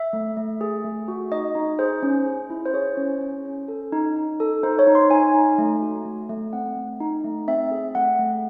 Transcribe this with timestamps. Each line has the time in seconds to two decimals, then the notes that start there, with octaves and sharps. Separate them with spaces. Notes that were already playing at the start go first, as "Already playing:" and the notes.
Already playing: E5
0.13 A3
0.37 A3
0.61 G#4
0.84 A3
1.08 F#4
1.32 D#4 D#5
1.55 D#4
1.79 G#4 C5
2.03 C#4
2.26 G#4
2.50 E4
2.66 C5
2.74 G#4 C#5
2.97 C#4
3.21 C#4
3.45 C#4
3.68 A4
3.92 D#4
4.16 D#4
4.40 A4
4.63 D#4 C5
4.79 C#5
4.87 D#4
4.95 C6
5.11 D#4 G#5
5.34 D#4
5.58 A3
5.82 F#4
6.05 A3
6.29 A3
6.53 C4 F#5
6.76 A3
7.00 D#4
7.24 A3
7.48 C4 E5
7.71 G#4
7.95 A3 F#5
8.19 A3